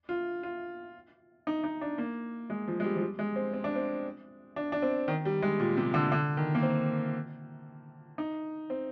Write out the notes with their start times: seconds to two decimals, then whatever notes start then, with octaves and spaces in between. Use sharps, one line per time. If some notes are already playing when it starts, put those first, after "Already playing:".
0.09 F4
0.43 F4
1.47 D#4
1.64 D#4
1.81 D4
1.98 A#3
2.50 G#3
2.68 F3
2.80 G#3
2.84 G3
2.96 F3
3.02 G3
3.19 G#3
3.36 C4
3.53 C4
3.64 D4
3.75 C4
4.56 D4
4.72 D4
4.82 C4
5.08 D#3
5.25 G3
5.42 G#3
5.60 A#2
5.77 C3
5.94 D3
6.12 D3
6.37 D#3
6.55 A#3
6.63 C4
8.18 D#4
8.70 C4